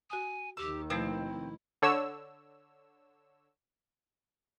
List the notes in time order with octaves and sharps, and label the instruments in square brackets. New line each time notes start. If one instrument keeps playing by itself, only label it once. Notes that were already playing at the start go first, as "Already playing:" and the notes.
[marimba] F#4 D#6 [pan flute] G#5
[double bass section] D#2 D#3 [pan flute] G4 [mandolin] E6
[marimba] B2 F3 A3 [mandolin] C4 [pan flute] E4
[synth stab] D3 C#5 E6